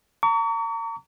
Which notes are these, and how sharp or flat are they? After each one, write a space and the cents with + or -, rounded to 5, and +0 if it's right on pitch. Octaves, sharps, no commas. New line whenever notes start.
A#5 -35 C#6 +40